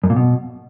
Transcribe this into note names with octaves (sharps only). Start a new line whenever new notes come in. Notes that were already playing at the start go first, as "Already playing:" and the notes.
F#2
A#2
B2